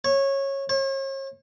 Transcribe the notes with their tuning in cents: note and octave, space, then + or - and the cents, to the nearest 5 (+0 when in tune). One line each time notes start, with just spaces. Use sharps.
C#5 -15
C#5 -40